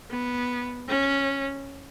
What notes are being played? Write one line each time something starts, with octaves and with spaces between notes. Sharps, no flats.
B3
C#4